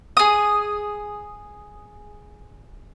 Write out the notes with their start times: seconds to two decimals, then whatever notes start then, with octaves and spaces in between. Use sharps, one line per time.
0.17 G#4 D#6